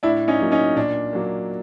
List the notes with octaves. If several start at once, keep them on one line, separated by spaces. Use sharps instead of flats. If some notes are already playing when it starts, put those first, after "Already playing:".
A2 D4 E4
C#4 D#4
F#3 A#3
C#4 D#4
A#2 D4
F#3 A#3